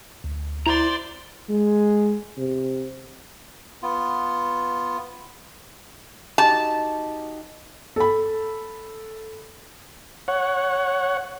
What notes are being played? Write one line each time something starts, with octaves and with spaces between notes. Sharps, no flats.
D2
E4 C5 D5 A#5 C6
G#3
C3
B3 F4
D#4 F#4 G4 A5
A4 B5
C#5 F#5